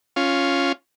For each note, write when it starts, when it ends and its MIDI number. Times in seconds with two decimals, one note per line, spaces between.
0.16 0.72 61
0.16 0.72 65